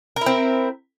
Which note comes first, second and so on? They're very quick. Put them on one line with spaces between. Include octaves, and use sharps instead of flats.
A#4 E4 C4